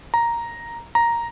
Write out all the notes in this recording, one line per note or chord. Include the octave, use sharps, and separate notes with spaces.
A#5
A#5